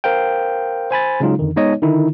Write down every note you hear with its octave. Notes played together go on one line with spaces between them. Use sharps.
A#4 C5 F5 G5
C5 G#5 B5 A6
C#3 F#3 G#3 D#4 F4
F2 D3 D#3
G#3 B3 D#4 C#5 D#5
D3 D#3 D#4 E4